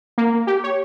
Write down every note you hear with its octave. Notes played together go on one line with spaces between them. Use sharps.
A#3
G4
C#5